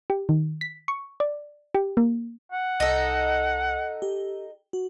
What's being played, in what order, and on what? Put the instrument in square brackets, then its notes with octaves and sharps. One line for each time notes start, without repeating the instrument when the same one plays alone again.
[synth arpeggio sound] G4
D#3
B6
C#6
D5
G4
A#3
[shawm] F#5
[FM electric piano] C2 [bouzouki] D#4 A4
[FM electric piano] G4
F#4